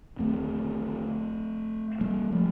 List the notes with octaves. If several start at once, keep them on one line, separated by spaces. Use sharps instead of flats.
D#2 D3 A3 C4
G3 A#3
F3 A3